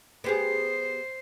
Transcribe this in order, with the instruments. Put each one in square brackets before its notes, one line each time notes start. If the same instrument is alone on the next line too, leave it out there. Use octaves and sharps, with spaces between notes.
[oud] B3 G4 G#4 [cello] C5